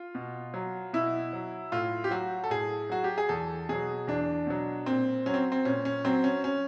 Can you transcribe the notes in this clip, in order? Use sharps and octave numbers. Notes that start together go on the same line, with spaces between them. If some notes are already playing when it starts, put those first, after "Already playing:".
Already playing: F4
B2
F#3
B2 E4
F#3
A2 F4
G4
F#3 F#4
A4
A2 G#4
F#3 F#4
G4
G#4
E2 A4
B2 F#3 G#4
E2 D4
B2 F#3
A#2 C4
F#3 C#4
C4
C4
A#2 C#4
C#4
F#3 C4
C#4
C#4